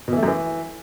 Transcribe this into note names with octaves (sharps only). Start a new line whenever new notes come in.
B2
E3
A3
F#2
E3